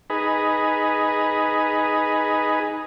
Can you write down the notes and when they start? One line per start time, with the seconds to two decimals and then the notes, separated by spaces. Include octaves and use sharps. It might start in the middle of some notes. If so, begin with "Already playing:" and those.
0.10 D#4 G#4 B4